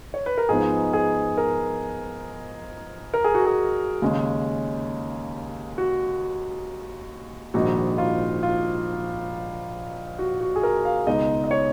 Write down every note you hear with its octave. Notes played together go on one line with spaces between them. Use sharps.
C#5
B4
A#4
G#2 F3 B3 D#4 G#4
G#4
A#4
A#4
G#4
F#4
G#4
D#2 C#3 G#3 C#4
F#4
A#1 G#2 D#3 F#4
F4
F4
F#4
F#4
G#4
A#4
F5
C#2 B2 G#3 D#4 D#5
D#5
C#5